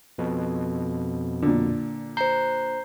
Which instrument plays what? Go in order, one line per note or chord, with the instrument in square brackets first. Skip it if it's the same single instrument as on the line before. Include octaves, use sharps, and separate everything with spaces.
[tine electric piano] F2 B2
[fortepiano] A#2 D3
[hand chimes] C5 A#5 [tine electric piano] G6 C7